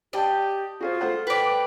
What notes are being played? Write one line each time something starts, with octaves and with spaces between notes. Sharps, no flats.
G4 D5 D#5 G5 A5
F4 F#4 G#4 C5
A3 C5 F#5
B4 D5 G5